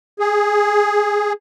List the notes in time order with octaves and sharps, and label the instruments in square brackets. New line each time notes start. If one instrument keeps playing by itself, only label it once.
[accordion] G#4